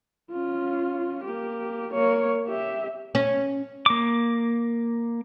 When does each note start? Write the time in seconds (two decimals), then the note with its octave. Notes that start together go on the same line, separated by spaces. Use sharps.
0.31 C#4 F4
1.23 A#3 G4
1.93 A#3 C#5
2.48 G4 E5
3.15 C#4
3.86 A#3 D6